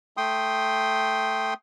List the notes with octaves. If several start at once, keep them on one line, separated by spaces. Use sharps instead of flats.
A3 G5 C6 D#6